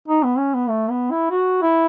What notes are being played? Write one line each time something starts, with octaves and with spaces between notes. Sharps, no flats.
D#4
B3
C#4
B3
A3
B3
E4
F#4
E4